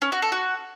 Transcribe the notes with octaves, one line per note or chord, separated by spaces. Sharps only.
C#4
F#4
A4
F#4